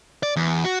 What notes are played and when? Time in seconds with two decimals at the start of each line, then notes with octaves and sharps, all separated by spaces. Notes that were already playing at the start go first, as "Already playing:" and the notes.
0.23 D5
0.36 E2
0.64 F#4